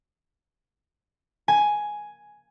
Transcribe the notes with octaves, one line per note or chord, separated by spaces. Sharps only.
G#5